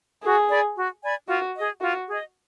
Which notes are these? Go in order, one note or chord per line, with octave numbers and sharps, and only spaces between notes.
F#4 G#4
D5 G#5 B5
F#4
D5 G#5 B5
F4 F#4
G#4 D#5
F4 F#4
G#4 D#5